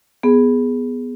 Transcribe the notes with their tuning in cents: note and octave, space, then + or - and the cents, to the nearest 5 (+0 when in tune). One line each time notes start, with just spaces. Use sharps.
B3 +0 G#4 +0